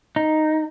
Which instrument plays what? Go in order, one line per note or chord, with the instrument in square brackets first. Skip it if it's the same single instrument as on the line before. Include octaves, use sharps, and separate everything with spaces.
[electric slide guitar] D#4